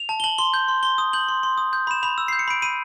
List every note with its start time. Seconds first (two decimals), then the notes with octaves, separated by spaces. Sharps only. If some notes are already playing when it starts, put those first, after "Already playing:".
Already playing: F7
0.09 A5
0.20 G7
0.24 A5 F#7
0.38 C6 G7
0.54 G6
0.68 C6
0.83 C6 G7
0.98 D#6
1.13 G6 F#7
1.28 C6
1.43 C6
1.58 D#6
1.73 G6
1.87 B5 E7
2.03 B5 F7
2.18 E6
2.28 G6 C7
2.39 C#7
2.48 B5 D7
2.62 B5 D#7